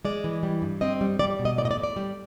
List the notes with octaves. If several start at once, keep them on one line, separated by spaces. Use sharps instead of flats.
G#3 D5
E3
G3
G2
C4 D#5
G3
G3 D5
B2
D#5
A2 D5
D#5
D5
A2
D5
G3